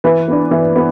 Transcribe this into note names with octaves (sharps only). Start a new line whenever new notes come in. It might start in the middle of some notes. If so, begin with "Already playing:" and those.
E3 B4
B3 D4
E3
B3